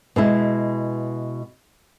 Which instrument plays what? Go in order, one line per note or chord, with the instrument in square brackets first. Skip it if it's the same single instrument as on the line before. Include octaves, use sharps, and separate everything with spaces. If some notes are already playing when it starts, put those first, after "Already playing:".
[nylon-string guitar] B2 G#3 E4